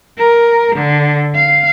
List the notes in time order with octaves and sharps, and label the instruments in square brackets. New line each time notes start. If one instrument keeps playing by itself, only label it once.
[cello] A#4
D3
F5